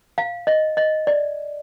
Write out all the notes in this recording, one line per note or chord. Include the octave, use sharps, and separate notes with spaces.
F5
D#5
D#5
D5